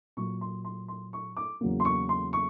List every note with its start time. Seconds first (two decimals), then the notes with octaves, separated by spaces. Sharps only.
0.17 A#2 F#3 A#3 C#6
0.41 C6
0.65 C6
0.88 C6
1.13 C#6
1.37 D6
1.61 E2 C#3 F#3 A#3
1.80 C6
1.85 C#6
2.09 C6
2.33 C#6